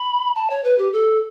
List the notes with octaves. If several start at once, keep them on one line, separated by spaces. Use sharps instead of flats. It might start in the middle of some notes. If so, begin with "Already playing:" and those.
Already playing: B5
A5
C#5
B4
G4
A4